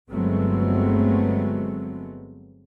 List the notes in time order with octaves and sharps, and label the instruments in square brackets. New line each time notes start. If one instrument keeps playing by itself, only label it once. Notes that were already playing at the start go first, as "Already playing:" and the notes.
[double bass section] G1 F#3 G#3 A3 B3 C4